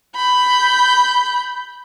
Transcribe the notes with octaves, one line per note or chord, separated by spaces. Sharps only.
B5 G6